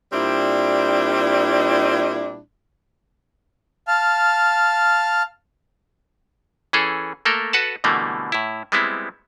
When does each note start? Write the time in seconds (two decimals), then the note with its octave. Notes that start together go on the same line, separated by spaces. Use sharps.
0.13 A#2 G3 C4 D4 E4
3.88 F5 A5 F6
6.73 E3 C#4 G#4 A4
7.25 A3 A#3 A4 A#4
7.53 F#4 A4 B4 F#5 A5
7.84 B2 D3 E3 G3 A3 A#3
8.32 A2 E4
8.72 G3 G#3 B3 C4 E4